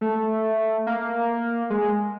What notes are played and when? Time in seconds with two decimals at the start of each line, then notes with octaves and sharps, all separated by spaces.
0.01 A3
0.87 A#3
1.70 G#3